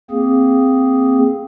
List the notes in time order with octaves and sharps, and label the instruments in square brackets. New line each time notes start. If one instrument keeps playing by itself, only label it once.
[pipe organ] A#3 C4 G#4